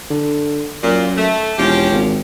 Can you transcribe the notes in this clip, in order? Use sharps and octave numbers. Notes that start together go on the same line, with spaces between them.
D3
F#2 A#2
A3
E1 F3 C#4 G4
G#1